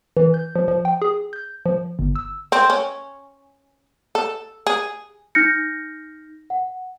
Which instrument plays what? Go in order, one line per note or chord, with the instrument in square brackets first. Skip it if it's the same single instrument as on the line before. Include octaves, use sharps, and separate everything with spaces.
[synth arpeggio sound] E3
G6
F3
F3
G5
G#4
G6
F3
G1
E6
[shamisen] C4
C#4
A4
G#4
[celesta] D#4 F6 G6 A#6 C#7
F#5